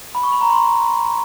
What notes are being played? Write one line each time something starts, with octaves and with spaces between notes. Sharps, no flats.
B5
C#6
B5
A#5
C6